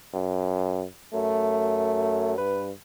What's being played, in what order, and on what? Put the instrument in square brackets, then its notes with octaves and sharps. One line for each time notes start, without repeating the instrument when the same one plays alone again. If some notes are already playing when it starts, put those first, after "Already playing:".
[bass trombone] F#2
[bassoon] F#2 [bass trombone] A3
[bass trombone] G2 [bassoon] B4